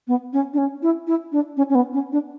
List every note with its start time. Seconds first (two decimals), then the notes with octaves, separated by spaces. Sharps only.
0.08 B3
0.33 C#4
0.53 D4
0.58 C#4
0.82 E4
1.07 E4
1.32 D4
1.57 C#4
1.69 C#4
1.75 B3
1.93 C#4
2.12 D4